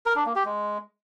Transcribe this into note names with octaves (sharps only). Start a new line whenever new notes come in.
A#4
D4
A#3
G4
G#3